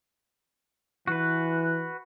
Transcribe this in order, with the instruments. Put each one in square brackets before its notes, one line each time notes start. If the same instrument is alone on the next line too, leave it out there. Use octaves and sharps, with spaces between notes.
[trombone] E3 [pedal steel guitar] F#4 B4